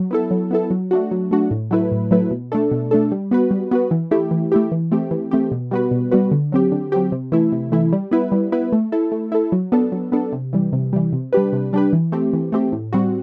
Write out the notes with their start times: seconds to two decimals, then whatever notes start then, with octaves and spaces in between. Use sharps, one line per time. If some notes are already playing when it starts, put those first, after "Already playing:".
Already playing: F#3
0.11 B3 E4 A4
0.31 F#3
0.51 B3 E4 A4
0.70 F#3
0.91 A3 D4 F#4
1.11 F#3
1.31 A3 D4 F#4
1.51 A2
1.71 F#3 A3 E4 B4
1.92 A2
2.11 F#3 A3 E4 B4
2.31 B2
2.52 A3 D4 A4
2.71 B2
2.91 A3 D4 A4
3.12 G3
3.31 B3 F#4 B4
3.51 G3
3.71 B3 F#4 B4
3.91 E3
4.11 A3 E4 G4
4.31 E3
4.52 A3 E4 G4
4.72 E3
4.92 A3 C4 G4
5.11 E3
5.31 A3 C4 G4
5.52 B2
5.71 G3 B3 F#4 B4
5.91 B2
6.11 G3 B3 F#4 B4
6.32 D3
6.52 F#3 C4 G4
6.72 D3
6.92 F#3 C4 G4
7.12 C3
7.32 E3 A3 E4
7.52 C3
7.72 E3 A3 E4
7.92 G3
8.11 B3 E4 B4
8.32 G3
8.52 B3 E4 B4
8.72 A3
8.92 E4 A4
9.12 A3
9.32 E4 A4
9.52 F#3
9.72 B3 D4 A4
9.92 F#3
10.12 B3 D4 A4
10.32 C3
10.53 E3 G3
10.73 C3
10.93 E3 G3
11.13 C3
11.33 G3 D4 G4 B4
11.53 C3
11.73 G3 D4 G4 B4
11.93 E3
12.12 A3 C4 G4
12.33 E3
12.52 A3 C4 G4
12.72 A2
12.93 G3 C4 F#4